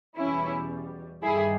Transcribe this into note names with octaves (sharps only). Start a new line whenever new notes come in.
E2 B2 G3 C#4 E4
G2 D#3 G3 E4 G#4